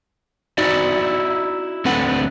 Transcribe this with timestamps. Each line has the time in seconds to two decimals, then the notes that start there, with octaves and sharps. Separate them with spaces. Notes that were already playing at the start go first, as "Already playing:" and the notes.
0.58 D#4 E4 F#4 D5 E5
1.85 D2 D3 C4 A4 B4 F#5